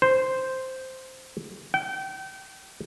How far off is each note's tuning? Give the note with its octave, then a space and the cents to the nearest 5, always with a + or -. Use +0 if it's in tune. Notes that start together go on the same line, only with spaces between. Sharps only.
C5 -5
G5 -30